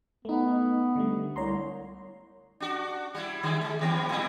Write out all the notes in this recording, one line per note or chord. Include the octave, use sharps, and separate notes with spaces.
A3 B3 D#4
D3 G3 A3
C2 C#5 A#5 C6
D4 F#4
G3 E4
D3 G3 G#4
G#3
G2 D#3 B3
A2 G3 E4